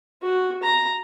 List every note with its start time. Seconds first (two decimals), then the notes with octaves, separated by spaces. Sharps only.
0.23 F#4
0.63 A#5